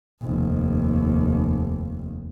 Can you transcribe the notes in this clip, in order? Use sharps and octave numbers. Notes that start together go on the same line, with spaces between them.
F1 D#2